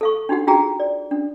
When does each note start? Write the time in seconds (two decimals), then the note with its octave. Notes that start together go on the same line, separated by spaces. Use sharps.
0.01 A4 F5 C#6
0.29 D4 D#4 F#4 G4 F#5
0.47 D4 F4 F#4 G#4 G5 A#5
0.80 D5
1.11 D4